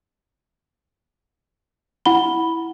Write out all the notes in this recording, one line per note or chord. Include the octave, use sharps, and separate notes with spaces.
E4 F#5 B5 G7